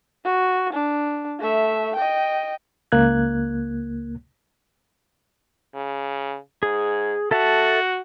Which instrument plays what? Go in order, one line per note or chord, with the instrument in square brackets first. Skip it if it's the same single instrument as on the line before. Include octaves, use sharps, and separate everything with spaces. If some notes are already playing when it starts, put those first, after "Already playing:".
[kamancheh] F#4
D4
A3 E5
D#5 G5
[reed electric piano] C#2 A#3 F#6 G#6
[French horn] C#3
[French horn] G#2 [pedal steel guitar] G#4
[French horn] F#4 [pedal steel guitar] A4 E5 A5